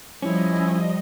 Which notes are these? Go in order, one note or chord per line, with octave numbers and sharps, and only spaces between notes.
F3 G3 C#4 E4 D#5